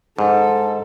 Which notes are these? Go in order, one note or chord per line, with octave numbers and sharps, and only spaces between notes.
G#2 A4